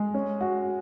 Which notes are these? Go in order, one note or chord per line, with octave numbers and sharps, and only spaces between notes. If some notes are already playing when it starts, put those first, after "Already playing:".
Already playing: G#3
C#4
F#4